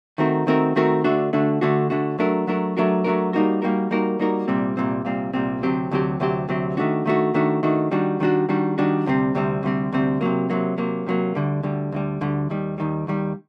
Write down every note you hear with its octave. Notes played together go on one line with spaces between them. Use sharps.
D#3 A3 C4 F#4 A#4
D#3 A3 C4 F#4 A#4
D#3 A3 C4 F#4 A#4
D3 A3 D4 F#4
D3 A3 D4 F#4
D3 A3 D4 F#4
D3 A3 D4 F#4
F#3 A3 D4 F#4 A#4
F#3 A3 D4 F#4 A#4
F#3 A3 D4 F#4 A#4
F#3 A3 D4 F#4 A#4
G3 A#3 D#4 F#4 A#4
G3 A#3 D#4 F#4 A#4
G3 A#3 D#4 F#4 A#4
G3 A#3 D#4 F#4 A#4
C2 A#2 G3 C4
C2 A#2 G3 C4
C2 A#2 G3 C4
C2 A#2 G3 C4
D2 C3 F#3 C4 G4
D2 C3 F#3 C4 G4
D2 C3 F#3 C4 G4
D2 C3 F#3 C4 G4
D#3 A3 D4 F#4
D#3 A3 D4 F#4
D#3 A3 D4 F#4
D#3 A3 D4 F#4
D#3 G3 D4 F#4
D#3 G3 D4 F#4
D#3 G3 D4 F#4
D#3 G3 D4 F#4
D2 C3 G3 C4
D2 C3 G3 C4
D2 C3 G3 C4
D2 C3 G3 C4
C3 F#3 A#3
C3 F#3 A#3
C3 F#3 A#3
C3 F#3 A#3
D2 D3 G3
D2 D3 G3
D2 D3 G3
D2 D3 G3
D#2 D#3 G3
D#2 D#3 G3
D#2 D#3 G3